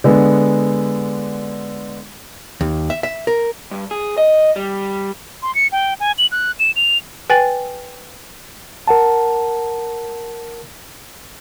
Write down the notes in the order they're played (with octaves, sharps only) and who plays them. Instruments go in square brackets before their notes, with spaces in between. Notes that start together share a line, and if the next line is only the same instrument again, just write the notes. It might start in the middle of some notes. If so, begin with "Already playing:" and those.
[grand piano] D3 G#3 B3
[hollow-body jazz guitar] D#2
E5
E5
A#4
[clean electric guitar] G2
G#4
D#5
G3
[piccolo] C6
C#7
G5
G#5
F#7
F#6
E7
F7
[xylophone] B4 G5 G#5 A6 F#7
[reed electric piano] A#4 F#5 A5